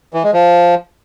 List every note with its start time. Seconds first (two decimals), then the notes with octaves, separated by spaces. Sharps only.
0.14 E3
0.23 G#3
0.33 F3